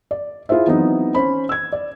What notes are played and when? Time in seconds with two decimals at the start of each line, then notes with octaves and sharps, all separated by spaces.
0.11 D5
0.49 E4 F4 G#4 C5 E5
0.67 E3 F#3 B3 C4 D#4
1.15 C#4 C5 B5
1.49 E6 G#6
1.72 D5